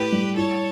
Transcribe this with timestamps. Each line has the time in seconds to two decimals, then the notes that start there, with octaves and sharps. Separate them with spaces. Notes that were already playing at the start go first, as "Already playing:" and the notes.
Already playing: A2 G4 B4
0.12 G3
0.36 E4 A4 C#5